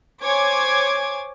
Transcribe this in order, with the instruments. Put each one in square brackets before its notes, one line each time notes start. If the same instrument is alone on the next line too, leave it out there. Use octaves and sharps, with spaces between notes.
[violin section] C5 C#5 G#5 D6 G#6